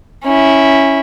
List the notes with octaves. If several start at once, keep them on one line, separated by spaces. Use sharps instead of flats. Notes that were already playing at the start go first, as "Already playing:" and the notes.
C#4 E4